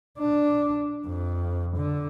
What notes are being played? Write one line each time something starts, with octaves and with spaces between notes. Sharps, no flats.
D4
F2
D3